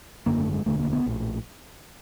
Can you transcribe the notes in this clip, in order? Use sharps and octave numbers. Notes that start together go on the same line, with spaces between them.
G#1 F#2 D3 A#3
A3
G#3
E1 D2 D3 A3
A#3
B3
A#1 A2